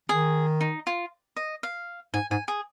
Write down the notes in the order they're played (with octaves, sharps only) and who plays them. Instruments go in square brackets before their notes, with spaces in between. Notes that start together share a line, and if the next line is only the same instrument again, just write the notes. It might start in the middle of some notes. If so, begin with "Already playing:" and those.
[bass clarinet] D#3 [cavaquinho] G#4
[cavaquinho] D#4
F4
D#5
F5
[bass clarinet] G#2 [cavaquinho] G#5
[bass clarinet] G#2 [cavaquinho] G#5
[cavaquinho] G#4